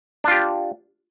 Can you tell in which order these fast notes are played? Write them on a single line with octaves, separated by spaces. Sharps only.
D4 F4 G4